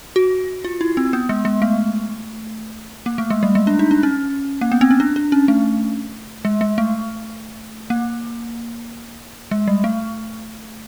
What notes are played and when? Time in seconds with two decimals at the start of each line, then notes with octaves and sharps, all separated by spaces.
0.16 F#4
0.65 F4
0.81 E4
0.97 C4
1.13 B3
1.29 G#3
1.45 G#3
1.62 A3
3.06 A#3
3.18 A3
3.30 G#3
3.43 G3
3.55 G#3
3.67 D4
3.79 D#4
3.91 D4
4.03 C#4
4.61 A#3
4.72 B3
4.81 C4
4.91 C#4
5.00 D4
5.16 D4
5.32 C#4
5.48 A3
6.45 G#3
6.61 G#3
6.78 A3
7.90 A#3
9.51 G#3
9.68 G3
9.84 A3